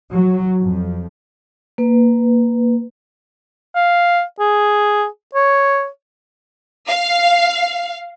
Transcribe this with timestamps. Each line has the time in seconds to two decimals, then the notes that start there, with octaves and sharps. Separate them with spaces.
0.13 F#3
0.60 F2
1.78 A#3 B4
3.75 F5
4.40 G#4
5.35 C#5
6.88 F5